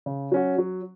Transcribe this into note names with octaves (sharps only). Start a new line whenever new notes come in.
C#3
F#3 C#4 F#4
F#3